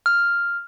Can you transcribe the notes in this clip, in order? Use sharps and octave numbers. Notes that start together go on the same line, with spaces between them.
F6